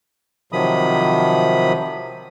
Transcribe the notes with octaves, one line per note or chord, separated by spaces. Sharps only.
C3 D#3 F3 F#3 B5 D#6